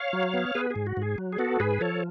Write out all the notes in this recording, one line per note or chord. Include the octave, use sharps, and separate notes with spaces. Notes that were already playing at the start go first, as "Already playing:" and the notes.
Already playing: C#5 F5
F#3
B3
B3 G#4 B4
G#4
G#2
F#4
G#2
G#4
F#3
G#4
B3 F#4 A4
G#2 G#4 B4
F3 A4 C#5